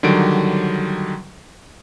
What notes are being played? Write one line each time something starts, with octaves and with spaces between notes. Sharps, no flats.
D3 D#3 F#3 G3 D7